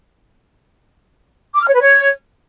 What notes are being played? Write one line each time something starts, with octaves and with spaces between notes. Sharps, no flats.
D6
F6
C#5
B4
C#5